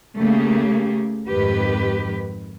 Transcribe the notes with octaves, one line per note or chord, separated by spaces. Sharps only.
C#3 A3 A#3 G4 G#4
F2 G#2 D#3 G4 B4